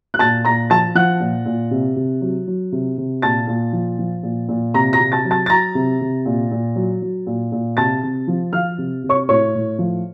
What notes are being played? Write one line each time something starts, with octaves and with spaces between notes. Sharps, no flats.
F#6
A#2 A5 A6
A#2 A#5 A#6
F3 A5 A6
F3 F#5 F#6
A#2
A#2
C3
C3
F#3
F#3
C3
C3
A#2 A5 A6
A#2
F3
F3
A#2
A#2
C3 A#5 A#6
A#5 A#6
C3
A5 A6
F#3
A5 A6
A6
F#3 A#5 A#6
C3
C3
A#2
A#2
F#3
F#3
A#2
A#2
C3 A5 A6
C3
F3
F3 F5 F6
C3
C3
C#5 C#6
A2 C#5 C#6
A2
F3